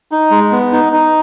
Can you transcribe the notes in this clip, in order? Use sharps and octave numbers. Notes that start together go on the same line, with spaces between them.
D#4
G#3
B3
D#4
D#4